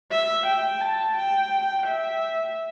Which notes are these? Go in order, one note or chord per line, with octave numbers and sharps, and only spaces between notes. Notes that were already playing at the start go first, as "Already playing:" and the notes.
E5
G5
A5
G5
E5